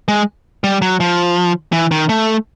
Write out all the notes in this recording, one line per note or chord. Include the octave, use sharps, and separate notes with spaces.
G#3
G3
F#3
F3
E3
D#3
A3